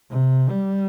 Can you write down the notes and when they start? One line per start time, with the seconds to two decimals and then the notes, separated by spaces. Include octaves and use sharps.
0.10 C3
0.50 G3